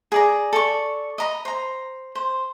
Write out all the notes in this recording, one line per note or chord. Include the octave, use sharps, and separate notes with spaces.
G#4 D5 A#5
A4 D5 C#6
D#5 A#5 B5
C5 A#5
C5